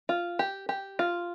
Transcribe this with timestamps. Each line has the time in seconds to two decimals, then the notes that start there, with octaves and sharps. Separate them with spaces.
0.09 F4
0.39 G4
0.69 G4
0.99 F4